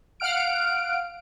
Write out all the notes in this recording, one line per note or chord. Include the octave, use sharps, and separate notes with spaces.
F5 F#5 F6 D7